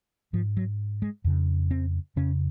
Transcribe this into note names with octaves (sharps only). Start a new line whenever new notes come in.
G#2 F3
F#3
G#3
F2 C#3
C4
F2 C#3 C#4